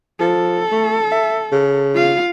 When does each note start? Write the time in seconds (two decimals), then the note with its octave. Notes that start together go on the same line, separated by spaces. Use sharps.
0.20 F3 A4
0.71 A3
1.11 E5
1.52 C#3
1.94 F4 F5